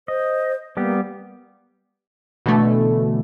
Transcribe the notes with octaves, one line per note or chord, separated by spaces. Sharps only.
C5 D#5
G3 A#3 B3 G4
B2 D3 E3 A3